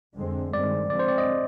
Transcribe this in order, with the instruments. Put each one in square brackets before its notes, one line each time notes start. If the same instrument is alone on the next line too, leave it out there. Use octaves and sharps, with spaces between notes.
[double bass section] F2 D3 G#3 C4
[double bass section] G2 D#3 G#3 C4 [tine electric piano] D5
[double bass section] D3 F3 G#3 C4 [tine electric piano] D5
[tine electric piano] C5
D5
D#5